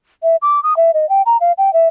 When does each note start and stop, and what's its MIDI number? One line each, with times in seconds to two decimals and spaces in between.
0.23 0.36 76
0.42 0.62 86
0.63 0.76 87
0.77 0.91 76
0.94 1.08 75
1.09 1.22 79
1.26 1.37 82
1.41 1.52 77
1.58 1.72 79
1.73 1.88 76